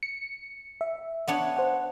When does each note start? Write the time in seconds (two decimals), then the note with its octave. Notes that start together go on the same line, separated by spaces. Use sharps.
0.03 C#7
0.81 E5
1.28 B3 D4 C#5
1.57 C5 F#5